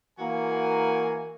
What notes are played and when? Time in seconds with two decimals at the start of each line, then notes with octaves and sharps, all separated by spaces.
0.19 E3 A#3 F#4 A#4 G#5